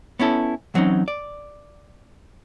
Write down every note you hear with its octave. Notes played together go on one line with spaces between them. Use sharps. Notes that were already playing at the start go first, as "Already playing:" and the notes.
B3 C#4 E4 A4
E3 F#3 C4 C#4 D#4
D5